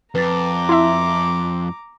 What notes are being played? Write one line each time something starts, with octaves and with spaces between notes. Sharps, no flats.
F2 B4 A#5 D6 A6
E4 E5 C6